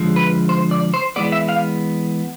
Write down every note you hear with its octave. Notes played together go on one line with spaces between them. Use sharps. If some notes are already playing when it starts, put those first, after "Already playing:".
Already playing: D3 F3 G#3
B4
C5
D5
C5
E3 G#3 B3 D5
E5
F5